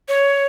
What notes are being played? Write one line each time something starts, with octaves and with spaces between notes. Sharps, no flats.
C#5